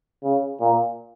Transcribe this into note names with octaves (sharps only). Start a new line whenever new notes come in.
C#3
A#2